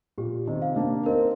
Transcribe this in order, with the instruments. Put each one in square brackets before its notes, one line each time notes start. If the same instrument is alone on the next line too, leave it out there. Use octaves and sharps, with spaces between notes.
[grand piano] A#2 [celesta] G4
[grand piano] C3 D#3
[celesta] F5
[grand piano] A#3 D4
[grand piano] C4 D#4 [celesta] A#4